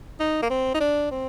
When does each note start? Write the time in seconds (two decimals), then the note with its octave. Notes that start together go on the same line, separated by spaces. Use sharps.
0.20 D#4
0.43 A#3
0.50 C4
0.74 D#4
0.80 D4
1.11 C4